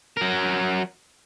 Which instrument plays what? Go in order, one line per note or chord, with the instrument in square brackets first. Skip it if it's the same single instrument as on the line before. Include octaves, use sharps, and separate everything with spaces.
[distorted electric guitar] F#3 A#4